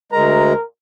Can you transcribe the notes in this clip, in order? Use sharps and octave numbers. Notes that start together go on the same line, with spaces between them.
D2 G#3 A#4 A#5